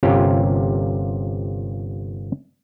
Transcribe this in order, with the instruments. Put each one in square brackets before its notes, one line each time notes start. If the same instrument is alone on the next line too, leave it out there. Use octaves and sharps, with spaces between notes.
[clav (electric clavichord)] G1 C3 A#3 C#4 F4 G4